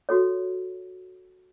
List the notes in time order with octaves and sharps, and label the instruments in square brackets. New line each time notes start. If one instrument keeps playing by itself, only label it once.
[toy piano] F#4 A4 C#5